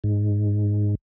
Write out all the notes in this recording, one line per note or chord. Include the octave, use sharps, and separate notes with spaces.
G#2